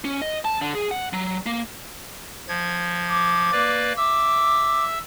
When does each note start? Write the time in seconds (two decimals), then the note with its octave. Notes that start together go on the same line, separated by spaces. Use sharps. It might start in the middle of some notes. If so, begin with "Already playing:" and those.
0.05 C#4
0.22 D#5
0.45 A5
0.61 D3
0.75 G#4
0.91 F#5
1.13 F#3
1.46 A#3
2.48 F3 G#6
3.10 D6
3.52 A#3 B4 D5
3.97 E5 D6 E6